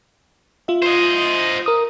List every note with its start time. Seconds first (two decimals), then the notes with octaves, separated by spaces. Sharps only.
0.68 F4 E5
0.83 C5 D#5
1.66 A#4 D#6